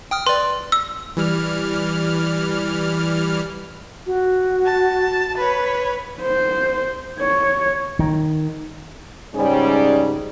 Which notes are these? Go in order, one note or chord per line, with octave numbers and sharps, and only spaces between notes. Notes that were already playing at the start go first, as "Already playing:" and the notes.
G5 D#6 F6
B4 D5 C6
E6
E3 G3 F6
F#4
A5
B4 C#5
C5
C#5
D#3
C#2 G#2 G3 C#4 G#4